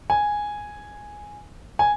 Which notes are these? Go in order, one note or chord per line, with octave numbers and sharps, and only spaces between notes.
G#5
G#5